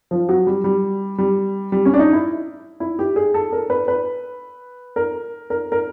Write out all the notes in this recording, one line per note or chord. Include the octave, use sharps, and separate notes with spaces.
F3
F#3
G3
G3
G3
G3
C#4
D4
D#4
E4
E4
G4
G#4
A4
A#4
B4
B4
A#4
A#4
A#4